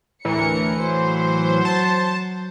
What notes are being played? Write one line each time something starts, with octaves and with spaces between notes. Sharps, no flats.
D2 A2 E3 A#4 C#7
F#3 C5
A5